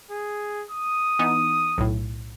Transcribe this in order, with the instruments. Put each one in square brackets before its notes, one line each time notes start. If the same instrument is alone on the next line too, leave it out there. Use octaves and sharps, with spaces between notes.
[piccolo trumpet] G#4
D#6
[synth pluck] E3 B3 D#4
B1 A2